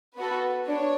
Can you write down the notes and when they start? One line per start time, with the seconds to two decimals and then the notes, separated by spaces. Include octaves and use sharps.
0.17 B3 F#4 A4 B4
0.68 D4 C#5